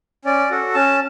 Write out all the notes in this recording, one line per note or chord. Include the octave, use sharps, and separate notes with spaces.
C#4 D5
F#4 A4
C#4 A5